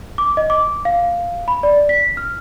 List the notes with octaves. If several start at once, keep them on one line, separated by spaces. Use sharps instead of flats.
D6
D#5
D6
F5
B5
D5
B6
F6